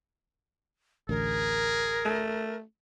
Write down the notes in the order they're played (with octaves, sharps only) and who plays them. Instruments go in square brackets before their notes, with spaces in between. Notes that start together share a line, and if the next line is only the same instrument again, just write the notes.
[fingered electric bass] A1 D2 [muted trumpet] G#4 [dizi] A#4
[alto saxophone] A3